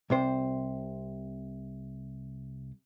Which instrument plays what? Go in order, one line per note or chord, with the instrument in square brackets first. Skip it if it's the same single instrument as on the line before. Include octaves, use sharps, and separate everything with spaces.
[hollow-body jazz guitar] C2 C3 C5